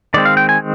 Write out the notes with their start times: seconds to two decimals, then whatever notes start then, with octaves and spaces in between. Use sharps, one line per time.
0.14 D#3 G#3 C4 D5
0.25 F5
0.37 G5
0.49 G#5